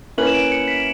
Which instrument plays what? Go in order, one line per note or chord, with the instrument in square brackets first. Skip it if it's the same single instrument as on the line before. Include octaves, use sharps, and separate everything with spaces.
[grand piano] A#3 C#4 E4 B4 [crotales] F#7
[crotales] E7
D7
C#7
B6